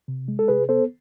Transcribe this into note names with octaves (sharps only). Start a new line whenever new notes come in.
C3
G#3
A4
C3 G#4 B4
B3 A4 C5